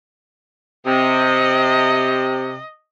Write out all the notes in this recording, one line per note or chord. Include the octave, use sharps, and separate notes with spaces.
C3 D#5